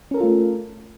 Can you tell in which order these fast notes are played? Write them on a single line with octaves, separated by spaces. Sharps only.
C#4 A#4 A4 F4 A3